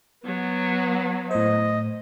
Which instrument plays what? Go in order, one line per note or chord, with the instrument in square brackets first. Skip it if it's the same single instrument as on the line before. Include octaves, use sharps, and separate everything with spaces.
[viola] F#3 B3
[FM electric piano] A2 C5 [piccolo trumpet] D#5